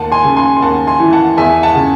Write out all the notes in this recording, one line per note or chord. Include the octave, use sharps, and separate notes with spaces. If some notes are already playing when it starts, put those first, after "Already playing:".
Already playing: D#2 F#5 A5
G#5 C6
C#3
G#5 C6
C6
D#2 F#5 A5
G#5 C6
E3
F#5 A5
E2 E5 G#5
F#5 A5
C#3